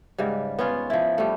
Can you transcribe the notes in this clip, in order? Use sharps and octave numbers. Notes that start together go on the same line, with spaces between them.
G#2 C#3 G3
B3 C#4 F4
F3 E4
G3 A3